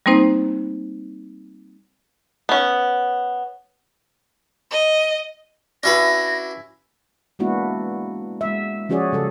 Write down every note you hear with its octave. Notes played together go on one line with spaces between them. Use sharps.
G3 A#3 C4 D#4 C5
B3 C#4
D#5
C#4 D4 E4 F#4 B4 A#6
G#3 A#3 B3 D4 E4 F#4
G#3 E5
F3 C#4 F#4 G#4 C#5 D5
C#3 G3 A4